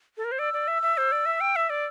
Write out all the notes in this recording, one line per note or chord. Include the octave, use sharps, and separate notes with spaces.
A4
A#4
C5
D5 E6
D5
E5
E5
C5
D5
E5
G5
E5
D5